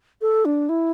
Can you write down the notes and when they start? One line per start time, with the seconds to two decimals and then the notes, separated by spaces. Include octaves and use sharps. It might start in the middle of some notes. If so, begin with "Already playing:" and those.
0.21 A4
0.45 D4
0.69 E4